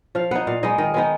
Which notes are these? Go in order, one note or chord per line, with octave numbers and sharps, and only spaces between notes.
F3 F5
B3 D#4 F#5
A#2 F5
G#3 B3 D#4 D#5
D#3 D#5
G#3 B3 D#4